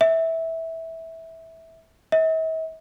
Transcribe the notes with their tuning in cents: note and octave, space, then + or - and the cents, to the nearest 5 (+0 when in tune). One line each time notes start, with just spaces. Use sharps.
E5 -15
E5 -45